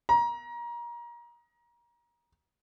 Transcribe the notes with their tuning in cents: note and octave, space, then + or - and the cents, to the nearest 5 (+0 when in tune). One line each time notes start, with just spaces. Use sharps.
A#5 +25